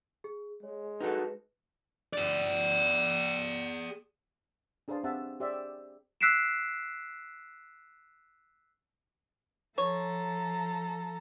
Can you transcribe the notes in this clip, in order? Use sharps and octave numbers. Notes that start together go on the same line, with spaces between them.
G#4
G#3 C#5
D#4 F#4 A4 B4
G#4 D5
D4 G#4 B4 C5 F5 A5
C4 G4 G#4 E5 F#5 A5
G4 G#4 C5 D5 E5
E6 F#6 B6 C7 D7 E7
F3 A4 C#5 A#5